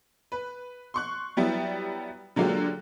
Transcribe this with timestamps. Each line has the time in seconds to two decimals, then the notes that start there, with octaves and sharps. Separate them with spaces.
0.32 B4
0.94 C6 C#6 F#6
1.37 F#3 G3 B3 E4
2.36 D3 F#3 G#3 A#3 F4 G4